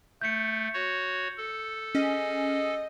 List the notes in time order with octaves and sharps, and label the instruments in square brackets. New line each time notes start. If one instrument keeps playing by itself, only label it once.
[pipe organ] A3 [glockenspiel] G6 C#7
[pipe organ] F#4 C#5
A4
[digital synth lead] C#4 [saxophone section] G#4 D#5